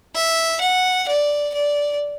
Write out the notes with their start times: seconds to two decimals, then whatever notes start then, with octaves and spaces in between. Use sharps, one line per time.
0.15 E5
0.61 F#5
1.08 D5
1.54 D5